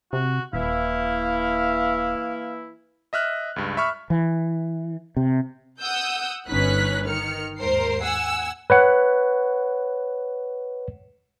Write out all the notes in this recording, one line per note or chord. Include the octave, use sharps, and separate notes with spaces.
C3 F#4
D#1 E3 A#3 E4 F5
D#5 E5 F6 F#6
C#2 G2
E5 B5 C#6 F6
E3
C3
F#5 D#6 E6 G6
G1 C#4 D#4 B4 F#6 B6
D#3 F6 C#7
D#2 G#2 A#4 C5 C7
F#5 G#5 E6
B4 C#5 F#5